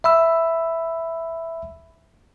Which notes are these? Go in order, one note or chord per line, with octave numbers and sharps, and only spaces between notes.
E5 B5 E6